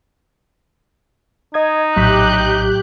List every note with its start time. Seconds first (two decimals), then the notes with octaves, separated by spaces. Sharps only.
1.54 D#4 D#5 D#6 G#6
1.96 A#1 A2 F#3 G4 F#6 G6 B6